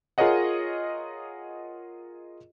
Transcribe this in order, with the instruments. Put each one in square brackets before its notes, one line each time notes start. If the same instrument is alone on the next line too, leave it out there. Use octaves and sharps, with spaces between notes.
[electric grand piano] F4 G#4 A#4 C#5 D#5 F#5